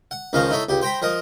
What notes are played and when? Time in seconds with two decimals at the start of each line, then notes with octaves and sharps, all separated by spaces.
0.11 F#5
0.33 C#2 D#3 F3 C#4 F5 A#5
0.50 D#4 E4 A4 C#5
0.69 C#2 G4
0.81 C5 G5 A#5 B5
1.02 F3 A#4 D#5